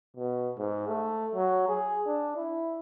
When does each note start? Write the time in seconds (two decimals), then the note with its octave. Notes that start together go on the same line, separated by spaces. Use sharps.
0.17 B2
0.58 G#2
0.88 A3
1.35 F#3
1.69 G#4
2.07 D4
2.37 E4